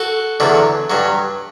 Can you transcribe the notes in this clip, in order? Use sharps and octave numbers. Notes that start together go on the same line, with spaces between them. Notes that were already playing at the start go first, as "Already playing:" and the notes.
Already playing: F#4 A4
E2 D3 F#3
G2 F#3